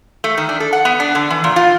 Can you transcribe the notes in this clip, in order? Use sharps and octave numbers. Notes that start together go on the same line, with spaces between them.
A3
D#3
D4
A4
F#5
B3
D4
D3
E3
A#2
F4